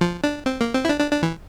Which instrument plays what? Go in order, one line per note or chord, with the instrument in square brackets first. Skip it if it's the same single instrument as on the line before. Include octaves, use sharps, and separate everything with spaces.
[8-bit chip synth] F3
D4
C4
A#3
C4
E4
D4
D4
D4
E3